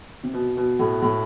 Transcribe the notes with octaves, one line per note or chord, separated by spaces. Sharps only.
C3
B2
B2
A2
A2